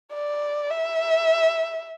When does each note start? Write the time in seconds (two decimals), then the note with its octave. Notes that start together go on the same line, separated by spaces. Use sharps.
0.13 D5
0.70 E5